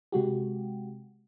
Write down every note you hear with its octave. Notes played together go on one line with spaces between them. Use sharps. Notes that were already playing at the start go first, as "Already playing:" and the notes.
C3 G#3 F#4 G4